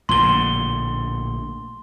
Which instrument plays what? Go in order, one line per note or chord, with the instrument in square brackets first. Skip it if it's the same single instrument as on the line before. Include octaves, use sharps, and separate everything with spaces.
[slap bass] A#1 A2 D3 [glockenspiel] C6 G7